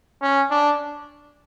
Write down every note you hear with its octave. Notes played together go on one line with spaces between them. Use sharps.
C#4
D4